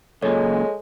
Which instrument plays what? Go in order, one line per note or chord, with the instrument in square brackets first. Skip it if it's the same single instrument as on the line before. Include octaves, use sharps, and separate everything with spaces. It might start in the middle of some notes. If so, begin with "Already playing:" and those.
[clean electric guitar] C#2 F#2 A#2 [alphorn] G#3 [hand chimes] A4 C#5